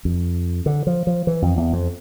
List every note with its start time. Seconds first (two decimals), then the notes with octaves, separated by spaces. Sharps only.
0.05 F2
0.66 D3
0.87 F3
1.07 F3
1.27 E3
1.42 F2
1.57 E2
1.73 F2